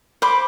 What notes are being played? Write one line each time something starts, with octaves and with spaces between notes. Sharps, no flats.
C5 B5 D6